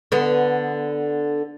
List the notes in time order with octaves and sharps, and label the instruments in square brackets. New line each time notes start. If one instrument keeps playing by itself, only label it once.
[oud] D3 B3